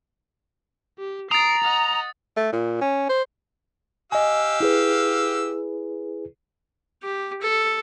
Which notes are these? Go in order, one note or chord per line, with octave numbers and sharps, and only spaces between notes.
G4
A#5 D#6 A6 C7 D7
D#5 F#5
A3
A#2
C#4
C5
G4 D#5 F5 G#5 E6
E4 G#4 B4
G4
A4